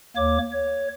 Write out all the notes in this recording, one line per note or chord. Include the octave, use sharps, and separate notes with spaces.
D#2 A#3 C#5 D6
C#5